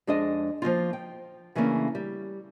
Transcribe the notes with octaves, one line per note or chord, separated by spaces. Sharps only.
F2 G#3 D4 G#4 D#5 G#5
F3 F#3 A#3 F4
G5
C#3 E3 A3 A#3 C#4 D4
G3